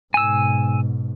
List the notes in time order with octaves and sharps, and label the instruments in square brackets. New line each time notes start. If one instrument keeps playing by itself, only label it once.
[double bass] G#2 B2 [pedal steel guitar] G#5 E6